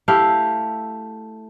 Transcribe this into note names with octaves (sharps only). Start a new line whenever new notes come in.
A3 E4 G4 F5